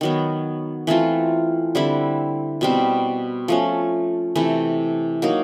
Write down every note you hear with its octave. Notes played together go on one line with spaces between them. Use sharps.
D#3 F#3 B3
E3 A3 C4 F4
D3 G3 C4 E4
B2 G3 C4
F3 A3 C#4
C3 E3 A3
F#3 A#3 D#4